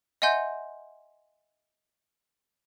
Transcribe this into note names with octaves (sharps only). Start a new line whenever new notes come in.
D#5 E5 F#5 G#5 C6 G6